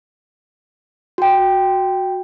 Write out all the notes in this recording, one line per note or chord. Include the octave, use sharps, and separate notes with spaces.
F#4 G5